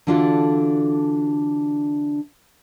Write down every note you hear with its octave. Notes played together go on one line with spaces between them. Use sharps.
D3 E3 D4 F4 F#4 A4